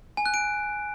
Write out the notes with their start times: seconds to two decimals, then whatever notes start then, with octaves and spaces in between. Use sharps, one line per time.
0.17 G#5
0.26 F#6
0.34 D7